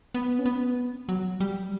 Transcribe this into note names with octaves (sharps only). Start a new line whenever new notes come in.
B3
C#4
B3
F#3
G3